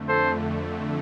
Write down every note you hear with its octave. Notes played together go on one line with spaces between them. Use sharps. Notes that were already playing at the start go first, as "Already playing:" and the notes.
Already playing: F2 D3 A3
A4 C5